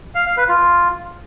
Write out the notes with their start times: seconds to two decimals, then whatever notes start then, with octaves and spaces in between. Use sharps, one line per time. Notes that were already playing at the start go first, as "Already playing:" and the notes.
0.15 F5
0.26 F5
0.37 B4
0.49 F4